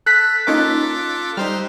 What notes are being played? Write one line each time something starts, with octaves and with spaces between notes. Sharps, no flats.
A4 F#6 B6
A#3 C#4 D#4 F4 A4 D6
G3 D#4 C5 F6